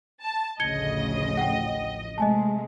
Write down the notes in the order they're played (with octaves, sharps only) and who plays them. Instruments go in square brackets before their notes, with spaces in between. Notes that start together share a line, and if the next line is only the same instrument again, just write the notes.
[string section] A5
[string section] A1 F3 D#5 [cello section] D2 C#3 [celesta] G#6 C#7 G7
[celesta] F#5 G5
[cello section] C3 G#3 A3 [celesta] D#5 G#5 A5